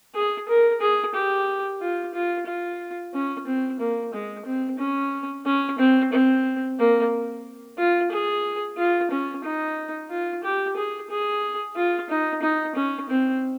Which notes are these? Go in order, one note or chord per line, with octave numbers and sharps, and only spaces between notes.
G#4
A#4
G#4
G4
F4
F4
F4
C#4
C4
A#3
G#3
C4
C#4
C#4
C4
C4
A#3
F4
G#4
F4
C#4
D#4
F4
G4
G#4
G#4
F4
D#4
D#4
C#4
C4